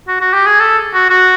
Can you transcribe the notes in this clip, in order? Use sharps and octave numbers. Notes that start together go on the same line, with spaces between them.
F#4
F#4
G4
G#4
A4
F#4
F#4